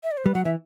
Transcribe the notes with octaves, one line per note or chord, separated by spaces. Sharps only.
E5
D5
C5
G3 B4
F#3 F#5
E3 E5